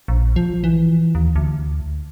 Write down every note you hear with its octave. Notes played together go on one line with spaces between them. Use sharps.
A#1
F3
E3
D#2
D2